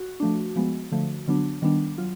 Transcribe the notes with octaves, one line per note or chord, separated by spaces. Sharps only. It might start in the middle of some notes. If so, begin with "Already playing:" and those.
Already playing: F#4
F3 A3 D4
F3 G#3 B3
D3 F3 A3
D3 F#3 B3 D4
D#3 G3 B3 D4
F#3 F4